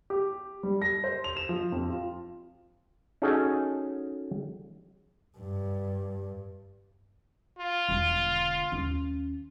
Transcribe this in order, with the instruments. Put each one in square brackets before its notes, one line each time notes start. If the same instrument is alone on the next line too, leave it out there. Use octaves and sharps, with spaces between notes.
[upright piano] G4
G3
A#6
C5
F7
E7
F3
F2
F4
[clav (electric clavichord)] C#4 D#4 F#4 G#4 A4
[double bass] G2
[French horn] F4
[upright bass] E1 D3
D#2 C#4